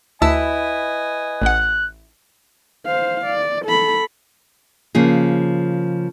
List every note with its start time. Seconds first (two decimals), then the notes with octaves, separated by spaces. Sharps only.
0.22 D2 E4 B4 D#5 G#5 A5 E6
1.42 A1 F#5 F#6
2.86 C5 F5
3.26 D5
3.66 A4 B5
4.95 C#3 F3 A#3 G#4